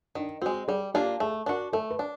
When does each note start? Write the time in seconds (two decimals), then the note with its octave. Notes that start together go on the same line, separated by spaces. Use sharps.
0.15 D#3 D4
0.42 C4 F#4
0.46 G#3
0.68 G3 G#4
0.94 A#3 D4 F4 G4
1.20 A3 G#4
1.46 D4 F#4 A#4
1.73 A3 A4
1.90 B4
1.99 D4